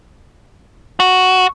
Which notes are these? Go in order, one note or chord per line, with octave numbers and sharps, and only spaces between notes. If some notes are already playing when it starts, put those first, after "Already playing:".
F#4